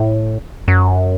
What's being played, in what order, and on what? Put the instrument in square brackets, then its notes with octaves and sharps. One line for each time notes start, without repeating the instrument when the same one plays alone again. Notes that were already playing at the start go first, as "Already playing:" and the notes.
Already playing: [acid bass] A2
F#2